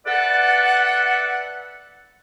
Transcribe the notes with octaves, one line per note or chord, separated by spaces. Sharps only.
A4 B4 D5 E5 F#5